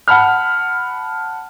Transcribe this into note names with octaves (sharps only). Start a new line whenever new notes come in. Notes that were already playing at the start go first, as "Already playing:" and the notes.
F#5 A5 B5 F6